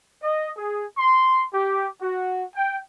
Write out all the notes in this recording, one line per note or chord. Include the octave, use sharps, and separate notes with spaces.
D#5
G#4
C6
G4
F#4
G5